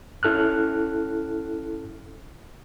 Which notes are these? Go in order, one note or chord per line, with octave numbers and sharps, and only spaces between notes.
C#4 E4 A4 F6 F#6